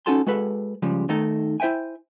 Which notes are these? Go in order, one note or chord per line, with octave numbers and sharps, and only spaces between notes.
C#4 D#4 F#4 A4 A5 C6
G#3 F#4 A4 B4
C#3 F3 G3 G#3
D#3 A3 D#4 A4
E4 C5 E5 G5 G#5